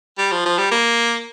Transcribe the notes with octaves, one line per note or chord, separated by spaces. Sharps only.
G3
F3
F3
G3
A#3